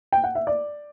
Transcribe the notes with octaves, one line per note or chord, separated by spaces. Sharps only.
G5
F#5
E5
D5